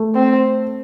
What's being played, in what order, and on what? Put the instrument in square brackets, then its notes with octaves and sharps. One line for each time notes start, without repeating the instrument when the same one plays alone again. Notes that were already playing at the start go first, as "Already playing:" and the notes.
Already playing: [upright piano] A3
[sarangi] C4